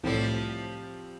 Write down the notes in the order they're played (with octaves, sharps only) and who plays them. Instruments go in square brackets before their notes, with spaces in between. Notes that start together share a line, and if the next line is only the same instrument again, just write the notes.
[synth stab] C2 A2 [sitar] F3 G3 C4